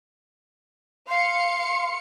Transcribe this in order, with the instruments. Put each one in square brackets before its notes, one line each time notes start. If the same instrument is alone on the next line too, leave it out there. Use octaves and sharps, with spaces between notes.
[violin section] F5 C#7 [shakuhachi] C6